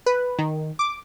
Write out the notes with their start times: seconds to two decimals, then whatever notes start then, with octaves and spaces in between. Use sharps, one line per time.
0.06 B4
0.38 D#3
0.79 D6